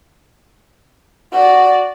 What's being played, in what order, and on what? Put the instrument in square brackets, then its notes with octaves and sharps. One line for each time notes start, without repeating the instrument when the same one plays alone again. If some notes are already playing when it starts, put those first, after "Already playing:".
[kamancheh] F#4 D5